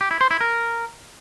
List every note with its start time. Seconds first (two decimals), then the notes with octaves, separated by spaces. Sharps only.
0.01 G4
0.11 E4
0.21 C5
0.31 E4
0.41 A#4